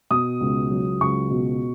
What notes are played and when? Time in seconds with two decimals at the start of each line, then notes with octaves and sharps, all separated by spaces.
0.10 B2 D#6
0.41 C#2
0.71 F#3
1.01 C#2 C#6
1.31 B2